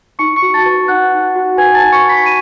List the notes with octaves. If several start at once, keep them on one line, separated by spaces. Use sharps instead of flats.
D#4 C#6 C#7
C#6 C#7
F#4
A5 A6
B4
D#4 F#5 F#6
D#4
F#4
B4 G#5 G#6
A5 A6
D#4
C#6 C#7
D#4
B5 B6
D#7